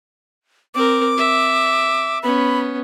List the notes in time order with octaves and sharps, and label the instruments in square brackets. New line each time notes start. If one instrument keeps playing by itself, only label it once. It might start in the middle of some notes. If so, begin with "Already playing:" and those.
[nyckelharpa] C4 A#4 [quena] D6
[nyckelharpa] E5
[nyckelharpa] B3 C#4 [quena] B5